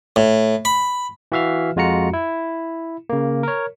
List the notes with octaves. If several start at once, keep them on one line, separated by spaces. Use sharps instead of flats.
A2
B5
E3 F#4 E5 F5 F6
F2 G#3 F4 F#4 A#5 C#7
E4
C#3 A#3
A#4 C#5